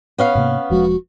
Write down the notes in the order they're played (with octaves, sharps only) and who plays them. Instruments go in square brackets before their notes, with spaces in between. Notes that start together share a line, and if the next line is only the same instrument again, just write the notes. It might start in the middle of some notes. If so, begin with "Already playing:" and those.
[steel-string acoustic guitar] B3 C#4 F5
[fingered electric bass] G#2 C3 A#3
[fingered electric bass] E1 F3 G#3 [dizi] F#4